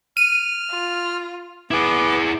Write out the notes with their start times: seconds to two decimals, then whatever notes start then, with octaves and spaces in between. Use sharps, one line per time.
0.17 F6 D#7
0.71 F4
1.71 B3 E4 G#4 D6